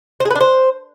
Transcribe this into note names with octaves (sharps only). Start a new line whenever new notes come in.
C5
G#4
B4
D4
C5